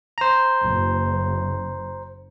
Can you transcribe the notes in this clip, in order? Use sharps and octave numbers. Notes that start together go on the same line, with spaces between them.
C5 A#5
F#1